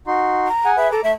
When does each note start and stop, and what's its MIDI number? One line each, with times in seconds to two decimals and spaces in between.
0.07 0.48 63
0.07 0.48 66
0.07 0.48 84
0.47 0.71 82
0.65 0.77 68
0.65 0.77 78
0.65 0.77 80
0.77 0.91 68
0.77 0.91 71
0.77 0.91 76
0.92 1.01 69
0.92 1.02 82
0.92 1.02 86
1.04 1.14 57
1.04 1.12 76